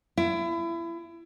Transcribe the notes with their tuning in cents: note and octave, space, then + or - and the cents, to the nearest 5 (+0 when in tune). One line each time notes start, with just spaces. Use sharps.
E4 +30